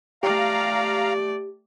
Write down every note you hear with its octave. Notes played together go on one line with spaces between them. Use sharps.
A3 G4 D5 F5 A#5